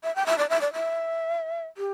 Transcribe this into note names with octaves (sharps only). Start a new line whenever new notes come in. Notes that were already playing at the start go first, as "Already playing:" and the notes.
E5
G5
E5
D5
E5
D5
E5
G4